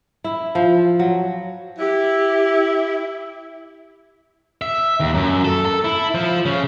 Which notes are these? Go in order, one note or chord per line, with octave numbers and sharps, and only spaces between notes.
E4
F3
F#3
E4 G4
E5
D#2
F#2
A4
A4
E4
F3
C#3